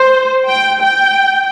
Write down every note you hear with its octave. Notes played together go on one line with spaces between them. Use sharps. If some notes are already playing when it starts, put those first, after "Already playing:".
Already playing: C5
G5
G5